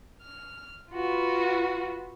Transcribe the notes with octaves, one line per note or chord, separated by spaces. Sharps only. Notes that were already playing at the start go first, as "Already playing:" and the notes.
F6
F4 F#4 B4